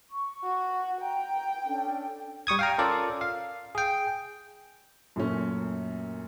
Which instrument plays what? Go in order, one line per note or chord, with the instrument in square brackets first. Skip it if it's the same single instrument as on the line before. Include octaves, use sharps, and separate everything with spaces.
[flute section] C#6
[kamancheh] F#4
[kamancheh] G5 [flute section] A#5
[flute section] C#4 D4 A4
[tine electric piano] G3 C#6 D#6 G#6
F5 G5 A#5
C#4 F4 A4 A#4 D5
F5
G#4 G5
[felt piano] F#2 A#2 A3 C#4